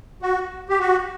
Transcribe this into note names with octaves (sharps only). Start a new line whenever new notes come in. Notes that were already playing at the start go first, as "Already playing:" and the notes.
F#4
G4
F#4